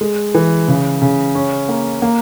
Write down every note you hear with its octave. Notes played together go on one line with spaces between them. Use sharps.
G#3
E3
C#3
C#3
C#4
A#3
A#3